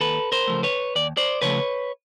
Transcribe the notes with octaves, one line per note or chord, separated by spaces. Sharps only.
D#2 A4 B4
A#4 C5
C#3 F3 A3
B4 C#5
D#2 D5
C5 D5
C#3 F3 A3 B4 C#5